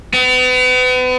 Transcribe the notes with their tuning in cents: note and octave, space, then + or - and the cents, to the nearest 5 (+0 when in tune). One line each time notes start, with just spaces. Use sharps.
B3 +40